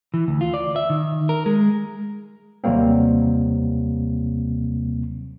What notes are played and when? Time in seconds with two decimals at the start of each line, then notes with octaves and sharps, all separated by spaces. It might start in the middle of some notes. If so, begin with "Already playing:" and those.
0.14 E3
0.28 D2
0.41 F4
0.54 D5
0.76 E5
0.90 D#3
1.29 A#4
1.46 G#3
2.64 D#2 C3 F#3 G3 A#3 C4